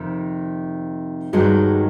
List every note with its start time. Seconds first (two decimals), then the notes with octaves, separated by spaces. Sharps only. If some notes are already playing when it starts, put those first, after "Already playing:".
Already playing: F2 C3 D#3
1.33 G2 D#3 F#3 G#3